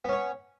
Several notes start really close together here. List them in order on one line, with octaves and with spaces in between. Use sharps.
B3 C#4 C#5